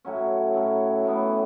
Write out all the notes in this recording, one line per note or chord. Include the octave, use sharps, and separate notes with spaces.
A2 F#3 C#4
A2 F#3 C#4
A2 E3 B3